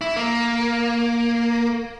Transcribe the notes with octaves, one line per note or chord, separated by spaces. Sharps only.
E4
A#3